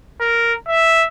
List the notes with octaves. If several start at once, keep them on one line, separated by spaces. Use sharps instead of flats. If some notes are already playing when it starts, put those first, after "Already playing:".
A#4
E5